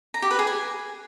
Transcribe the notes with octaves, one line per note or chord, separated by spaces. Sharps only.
A#5
G4
B4
G#4
G#5